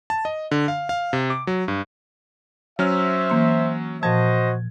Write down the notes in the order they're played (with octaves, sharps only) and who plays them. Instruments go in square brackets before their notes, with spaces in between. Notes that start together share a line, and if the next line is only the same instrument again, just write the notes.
[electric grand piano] A5
D#5
D3
F5
F5
C3
D6
F#3
G2
[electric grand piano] F#3 C#4 F6 [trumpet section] C5 E5
[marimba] E3 A#3 C6
[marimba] A#2 F3 [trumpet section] F#4 C5 D#5 [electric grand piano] A5 G#6